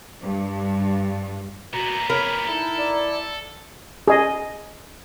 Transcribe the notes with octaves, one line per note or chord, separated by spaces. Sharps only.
G2
A#2 B3 F#4 A#5
A#4 C#5 B5
D#4 E4 A4
D5
G#4 D#5